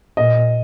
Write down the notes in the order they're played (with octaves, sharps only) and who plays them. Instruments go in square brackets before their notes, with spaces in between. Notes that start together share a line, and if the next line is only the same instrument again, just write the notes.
[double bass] A#2 [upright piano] D#5